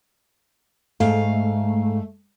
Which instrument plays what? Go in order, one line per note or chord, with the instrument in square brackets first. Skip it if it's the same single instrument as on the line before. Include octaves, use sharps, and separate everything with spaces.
[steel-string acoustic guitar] G#2 F5 [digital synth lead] A3